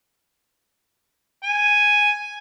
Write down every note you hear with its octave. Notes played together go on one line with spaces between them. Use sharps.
G#5